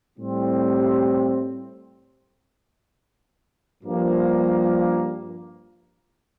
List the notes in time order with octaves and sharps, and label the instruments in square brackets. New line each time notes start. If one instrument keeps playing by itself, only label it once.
[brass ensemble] A2 G3 C4
G2 F3 A#3